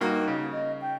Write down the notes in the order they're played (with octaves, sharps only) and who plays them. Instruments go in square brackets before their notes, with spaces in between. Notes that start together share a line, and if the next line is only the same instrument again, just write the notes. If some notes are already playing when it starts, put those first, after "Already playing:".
[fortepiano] G2 A#3 F#4 [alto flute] D#4
[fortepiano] C#3
[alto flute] D#5
G5